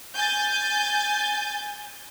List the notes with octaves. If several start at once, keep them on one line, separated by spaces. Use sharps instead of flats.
G#5 G6 A6